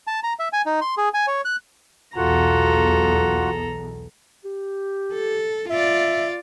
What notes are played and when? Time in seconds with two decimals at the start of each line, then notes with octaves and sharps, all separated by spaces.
0.07 A5
0.23 A#5
0.39 E5
0.53 G#5
0.66 D#4
0.81 C6
0.98 G#4
1.14 G#5
1.27 C#5
1.45 F#6
2.16 B1 E2 B2 F4 F#4 A4 F#5 A#5
4.45 G4
5.14 A4
5.70 F4 D5 E5